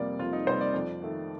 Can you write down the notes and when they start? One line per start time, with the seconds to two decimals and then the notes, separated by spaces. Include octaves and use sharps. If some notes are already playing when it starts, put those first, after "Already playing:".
Already playing: F2 C3 G3 A#3 D5
0.19 F2 F4
0.33 D#4
0.46 C3 G3 A#3 C5
0.61 D5
0.74 F2
1.02 D#3 A3